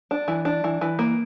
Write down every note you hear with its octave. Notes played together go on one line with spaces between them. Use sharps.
D4
E3
D4
E3
E3
A#3